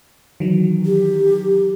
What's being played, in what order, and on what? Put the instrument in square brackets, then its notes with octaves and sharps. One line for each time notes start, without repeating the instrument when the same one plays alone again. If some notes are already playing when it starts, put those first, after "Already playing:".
[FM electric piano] D#3 E3 F#3
[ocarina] G4